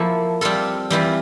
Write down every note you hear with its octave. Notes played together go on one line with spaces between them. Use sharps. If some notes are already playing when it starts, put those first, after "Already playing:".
Already playing: F3 A#3 E4 A4
G3 C4 F4 A4
E3 G3 C4 F4